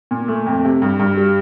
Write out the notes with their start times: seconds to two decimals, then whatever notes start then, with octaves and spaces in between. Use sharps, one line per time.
0.11 A#2
0.28 A3
0.47 F2
0.65 C3
0.82 G2
1.00 G2
1.17 G3